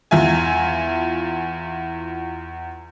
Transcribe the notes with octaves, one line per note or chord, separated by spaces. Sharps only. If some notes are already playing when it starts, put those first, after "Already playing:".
E2 F4 E5 G#5